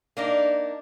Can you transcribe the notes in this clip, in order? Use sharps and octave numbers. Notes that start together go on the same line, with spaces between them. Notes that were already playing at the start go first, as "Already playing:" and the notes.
A#3 D4 D#4